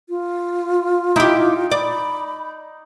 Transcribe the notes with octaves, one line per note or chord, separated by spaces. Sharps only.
F4
D#4 E4 G4 D6
D5 B5